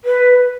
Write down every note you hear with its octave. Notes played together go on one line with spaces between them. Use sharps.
B4